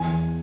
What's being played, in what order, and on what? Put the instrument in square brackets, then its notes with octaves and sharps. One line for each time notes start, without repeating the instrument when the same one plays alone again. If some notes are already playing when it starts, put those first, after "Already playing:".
Already playing: [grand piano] E2 G#5